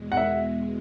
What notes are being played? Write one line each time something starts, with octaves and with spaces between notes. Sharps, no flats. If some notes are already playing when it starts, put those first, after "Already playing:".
Already playing: E2 B2 G#3
F#5
E5